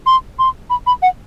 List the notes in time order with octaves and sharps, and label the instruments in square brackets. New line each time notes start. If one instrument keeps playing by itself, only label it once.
[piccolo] C6
C6
B5
B5
F#5